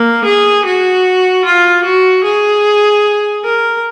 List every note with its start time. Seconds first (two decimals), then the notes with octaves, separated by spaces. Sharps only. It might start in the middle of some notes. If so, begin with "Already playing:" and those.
Already playing: A#3
0.25 G#4
0.66 F#4
1.45 F4
1.85 F#4
2.24 G#4
3.45 A#4